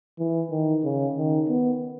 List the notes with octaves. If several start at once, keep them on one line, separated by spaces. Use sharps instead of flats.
E3
D#3
C#3
D#3
B3